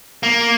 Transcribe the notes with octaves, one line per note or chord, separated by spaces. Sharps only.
A#3